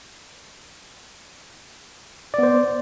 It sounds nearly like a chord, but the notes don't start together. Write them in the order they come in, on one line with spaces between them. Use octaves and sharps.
D5 B3 C5